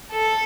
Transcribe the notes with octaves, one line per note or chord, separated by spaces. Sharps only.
A4